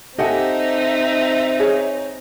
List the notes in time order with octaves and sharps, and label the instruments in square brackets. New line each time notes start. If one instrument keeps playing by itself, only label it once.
[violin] C4 D#4 [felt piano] G4 A4 [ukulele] D#5 F#5 G#5 [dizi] E5
[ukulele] G#4 C#5 G#5